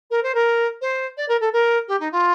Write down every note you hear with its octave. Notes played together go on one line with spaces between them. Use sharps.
A#4
C5
A#4
C5
D5
A#4
A4
A#4
G4
D#4
F4